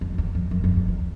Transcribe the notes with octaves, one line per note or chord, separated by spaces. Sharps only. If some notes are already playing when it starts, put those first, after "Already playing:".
F2
E2
F2
F#2
F2
E2
E2